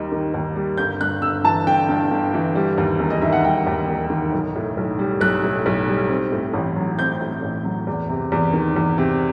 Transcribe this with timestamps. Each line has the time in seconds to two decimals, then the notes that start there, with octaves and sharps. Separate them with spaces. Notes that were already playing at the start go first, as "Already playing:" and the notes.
Already playing: D#2 G3 D#4
0.12 D#3
0.34 D#2
0.55 G3
0.78 G1 G6
1.01 G2 F#6
1.22 G1 E6
1.44 E3 A5
1.66 G1 G5
1.89 G2
2.11 G1
2.34 E3
2.55 G3
2.78 D#2
2.99 E1
3.10 D#5
3.22 D#3 E5
3.33 F#5
3.44 G3 G5
3.67 D#2
3.88 E1
4.10 D#3
4.33 B1
4.55 A2
4.77 B1
4.99 G3
5.21 B1 F#6
5.44 A2
5.66 B1
5.88 G3
6.09 C4
6.32 A2
6.54 A1
6.76 F#3
6.99 C4 G6
7.21 A2
7.42 A1
7.64 F#3
7.87 E2
8.09 C3
8.32 E2
8.53 D#3
8.76 E2
8.98 C3